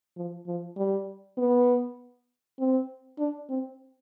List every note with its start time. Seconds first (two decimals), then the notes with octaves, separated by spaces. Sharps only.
0.16 F3
0.47 F3
0.77 G3
1.38 B3
2.59 C4
3.18 D4
3.49 C4